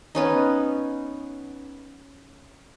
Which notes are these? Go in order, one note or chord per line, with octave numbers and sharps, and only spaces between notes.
B3 C#4 D#4